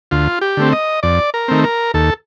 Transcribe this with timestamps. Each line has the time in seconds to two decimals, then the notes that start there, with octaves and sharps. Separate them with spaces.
0.11 D2 F4
0.41 G4
0.57 D3 A3 C4
0.72 D#5
1.03 F2 D5
1.34 A#4
1.48 D#3 A3 C4
1.64 A#4
1.94 D#2 A4